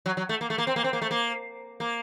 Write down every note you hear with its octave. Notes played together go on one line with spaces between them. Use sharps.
F#3
F#3
A3
A#3
A3
A#3
C4
A#3
C4
A#3
A3
A#3
A#3